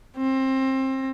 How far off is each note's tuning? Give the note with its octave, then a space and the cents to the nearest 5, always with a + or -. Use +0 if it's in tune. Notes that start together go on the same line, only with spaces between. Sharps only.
C4 +25